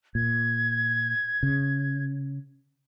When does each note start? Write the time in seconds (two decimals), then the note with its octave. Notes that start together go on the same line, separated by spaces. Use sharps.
0.15 A#2 G#6
1.43 C#3